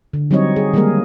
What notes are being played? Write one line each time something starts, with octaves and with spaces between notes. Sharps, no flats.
D3
F#3 G3 C4 D#4 C#5 D#5
G#4
D#3 G3 G#3 A#3 G#4 A#4